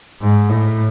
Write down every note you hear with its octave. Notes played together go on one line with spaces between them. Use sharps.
G#2
A2